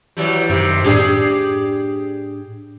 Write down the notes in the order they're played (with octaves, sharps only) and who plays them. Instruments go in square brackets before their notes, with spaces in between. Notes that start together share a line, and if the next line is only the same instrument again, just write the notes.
[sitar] E3 F#3 G3
[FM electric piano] F#2 [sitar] C3 D#3
[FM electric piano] A2 D4 [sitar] G4 G#4